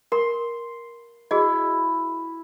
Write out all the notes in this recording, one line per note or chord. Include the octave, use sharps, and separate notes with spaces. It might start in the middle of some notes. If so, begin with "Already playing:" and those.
A#4 C6
E4 F#4 G#4 D#5